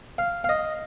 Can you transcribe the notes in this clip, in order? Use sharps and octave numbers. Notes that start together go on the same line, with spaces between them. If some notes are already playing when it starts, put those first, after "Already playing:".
F5
F5
D#5